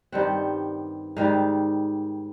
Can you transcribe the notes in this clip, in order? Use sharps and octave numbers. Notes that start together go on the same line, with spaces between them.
G2 D#3 G3 C4 F#5
G#2 D#3 G3 F5